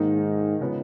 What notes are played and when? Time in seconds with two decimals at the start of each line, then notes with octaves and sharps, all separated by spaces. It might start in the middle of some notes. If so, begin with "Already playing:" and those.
Already playing: G#2 D#3 A#3 D#4
0.61 C#3 F3 G#3 B3 D#4